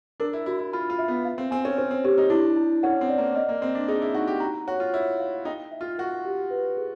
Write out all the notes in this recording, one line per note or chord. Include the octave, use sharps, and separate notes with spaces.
D4 A#4
E4
E4 F#4
E4
F4 B5
F4
E5
B3
F5
C4
C4 G#5
C#4
C#4 C5
C4
C#4 G4
D#4
D4 E4
E4
C#4 F#5
C4
D5
A#3
A#3 D#5
A#3
C4 D#5
D4
D#4 G#4
E4
D#4 F#4
G4
F#4 A#5
F#4 C#5
F4
E4 C#5
F5
D#4 G5
E5
F4
F#4 A#4
G4
B4
G#4